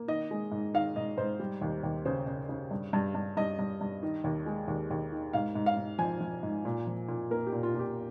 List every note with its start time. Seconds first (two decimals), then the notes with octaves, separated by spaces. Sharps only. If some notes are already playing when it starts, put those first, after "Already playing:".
Already playing: A#3
0.08 D#3 D#5
0.31 G#3
0.52 G#2
0.74 D#3 F5
0.96 G#2 D#5
1.18 G#2 C5
1.40 G3
1.61 D#2
1.83 D#2
2.05 C#3 C5
2.27 C#3
2.49 C#3
2.71 G2
2.93 G2
3.15 G2
3.37 G2 D#5
3.59 G2
3.81 G2
4.03 D#3
4.24 D#2
4.46 G#3
4.68 D#2
4.90 D#2
5.12 D#3
5.33 G#2 F5
5.55 G#2
5.66 F5
5.77 G#2
5.99 F3 G#5
6.21 F3
6.43 G#2
6.65 A#2
6.87 F3
7.09 A#2
7.31 A#3 A#4
7.47 G4
7.53 A#2
7.63 F4
7.74 A#2 G4